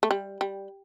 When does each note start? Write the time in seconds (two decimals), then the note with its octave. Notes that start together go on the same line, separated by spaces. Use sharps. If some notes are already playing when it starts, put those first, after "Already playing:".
0.03 A3
0.11 G3
0.41 G3